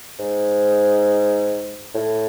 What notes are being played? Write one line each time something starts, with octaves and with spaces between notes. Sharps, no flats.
G#2
A2